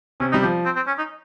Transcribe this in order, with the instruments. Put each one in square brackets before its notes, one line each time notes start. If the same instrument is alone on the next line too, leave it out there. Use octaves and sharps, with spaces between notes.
[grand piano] C3 [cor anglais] C#4
[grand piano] G3 [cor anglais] D#4
[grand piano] F3 [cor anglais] G4
[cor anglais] C4
C4
C#4
D#4